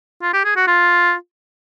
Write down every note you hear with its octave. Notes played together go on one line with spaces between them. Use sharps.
F4
G4
G#4
F#4
F4